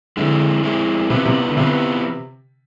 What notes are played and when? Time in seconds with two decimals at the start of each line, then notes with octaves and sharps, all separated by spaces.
0.17 D3 G#3 C4 E4
0.63 G#3 C4 E4
1.09 C3 E3 B3 F4 B4
1.26 C3
1.48 D3
1.57 C3 E3 B3 F4 B4